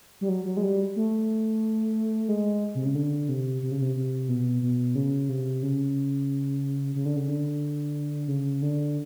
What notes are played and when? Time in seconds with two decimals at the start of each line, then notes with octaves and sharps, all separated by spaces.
0.21 G3
0.29 F#3
0.45 F#3
0.57 G#3
0.63 G3
0.96 A3
2.29 G#3
2.75 C3
2.85 C#3
2.95 D3
3.29 C3
3.62 C3
3.72 C#3
3.82 C3
3.95 C3
4.28 B2
4.62 B2
4.95 C#3
5.29 C3
5.63 C#3
6.95 C#3
7.05 D3
7.16 C#3
7.29 D3
8.28 C#3
8.62 D3